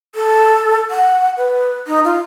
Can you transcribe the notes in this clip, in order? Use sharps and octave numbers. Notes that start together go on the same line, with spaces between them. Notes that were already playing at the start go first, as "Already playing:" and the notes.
A4
F#5
B4
D#4
F4